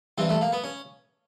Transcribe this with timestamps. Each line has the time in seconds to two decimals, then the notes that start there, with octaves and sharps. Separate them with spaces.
0.18 G2 E3 C4
0.29 A3
0.41 A#3
0.52 B3
0.64 C#4